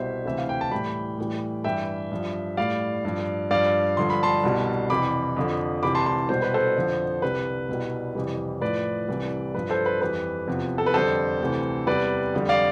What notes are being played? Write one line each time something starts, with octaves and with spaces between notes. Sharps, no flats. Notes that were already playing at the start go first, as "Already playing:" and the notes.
Already playing: C2 B2 G3 C5 E5
D2 C3 E3 E5
F5
G5
A5
A2 E3 G3 G5 B5
A2 E3 G3
G2 E3 G3 E5 G5
G2 F3
A2 G3 D5 F5
G2 F3
G2 F3 D5 F5
G2 D3 F3 C6
B5
A5 C6
C2 B2 G3
F2 C3 E3 G3 B5 D6
F2 D3 F3
C2 C3 E3 G3 B5 D6
A5 C6
A5 C6
C2 B2 G3 C5
B4
A4 C5
F2 D3 F3
C2 C3 G3 B4
C2 B2 G3
F2 C3 E3 G3
A2 F3 B4 D5
C2 C3 E3 G3
G2 F3 B4
A4 C5
B4
F2 E3 G3 B4
E2 C3 F3
A4
B4
F2 D3 G3 A4 C5
D2 C3 E3
E2 C3 G3 B4 D5
F2 D3 G3
D5 F5